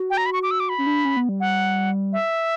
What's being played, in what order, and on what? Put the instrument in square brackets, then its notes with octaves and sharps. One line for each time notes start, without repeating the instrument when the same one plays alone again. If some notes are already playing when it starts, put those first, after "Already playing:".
Already playing: [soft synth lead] F#4
[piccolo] G5
A#5
B5
C#6
D6
E6
D6
B5
[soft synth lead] C#4
D4
C#4
B3
G3
[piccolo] F#5
E5